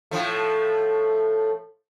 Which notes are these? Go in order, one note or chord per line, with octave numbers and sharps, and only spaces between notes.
A2 F3 A3